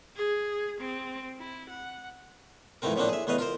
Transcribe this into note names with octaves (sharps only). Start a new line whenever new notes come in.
G#4
C4
E4
F#5
F2 G#2 E3 A3 C4 A#4
A2 F3 A3 A#3 C4 D4
G#4 E5
E2 A3 B4 D#5 F5
F4 A#4 C5